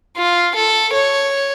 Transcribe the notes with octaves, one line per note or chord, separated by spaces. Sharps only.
F4
A4
C#5